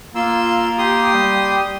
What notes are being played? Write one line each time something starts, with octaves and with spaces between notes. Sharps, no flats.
A#3 F4 C6 E6
G4 C6 D#6
G3